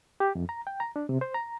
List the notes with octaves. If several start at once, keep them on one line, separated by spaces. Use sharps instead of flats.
G4
F2
A#5
G5
A#5
D4
C3
C5
A#5